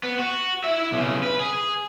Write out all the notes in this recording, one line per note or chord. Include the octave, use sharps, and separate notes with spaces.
B3
F#4
E4 E5
B1 C#3
B4
G#4